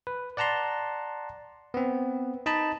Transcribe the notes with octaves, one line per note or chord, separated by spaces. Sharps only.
B4
D5 F#5 A5 A#5 C6
B3 C4
D#4 D#5 A5 B5